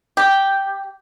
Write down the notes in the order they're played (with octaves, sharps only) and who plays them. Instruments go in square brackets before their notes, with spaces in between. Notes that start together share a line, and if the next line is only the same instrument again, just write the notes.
[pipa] G4